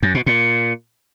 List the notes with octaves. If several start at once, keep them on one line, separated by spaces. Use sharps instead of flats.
F#2
B2
A#2